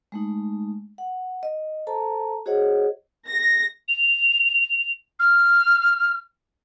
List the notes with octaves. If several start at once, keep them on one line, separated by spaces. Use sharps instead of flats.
G#3 A3 D#4
F#5
D#5
A4 C5 A5 A#5
F#4 G#4 C5 C#5 D#5 F#5
A#6
F7
F6